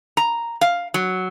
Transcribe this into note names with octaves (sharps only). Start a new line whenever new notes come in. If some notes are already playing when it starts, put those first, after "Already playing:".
A#5
F5
F#3